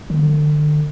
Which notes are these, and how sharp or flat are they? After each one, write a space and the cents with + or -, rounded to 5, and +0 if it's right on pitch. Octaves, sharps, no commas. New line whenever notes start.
D3 +35